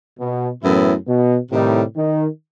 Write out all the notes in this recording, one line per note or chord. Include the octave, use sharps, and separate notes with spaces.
B2
F#2 A2 E3 B3 E4
B2
A2 C3 D#3 G3 D#4
D#3